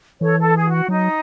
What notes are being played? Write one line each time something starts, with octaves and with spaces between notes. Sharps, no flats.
E3 A4 C#5
A4
G#4
F#4
F#3 D#4